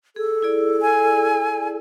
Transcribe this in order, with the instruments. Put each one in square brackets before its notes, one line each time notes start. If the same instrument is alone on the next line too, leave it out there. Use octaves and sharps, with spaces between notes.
[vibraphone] G#4 [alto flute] A4
[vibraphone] E4 G#4 D5
[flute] G#5